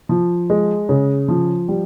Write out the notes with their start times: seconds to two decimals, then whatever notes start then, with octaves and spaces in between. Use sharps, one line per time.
0.09 F3
0.50 G#3
0.89 C#3
1.28 F3
1.68 G3